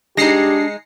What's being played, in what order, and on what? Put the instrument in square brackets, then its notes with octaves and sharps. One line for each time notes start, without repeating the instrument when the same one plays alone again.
[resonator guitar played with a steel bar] G#3 D#4 [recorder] D4 [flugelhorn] G4 [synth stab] A#6 C7 C#7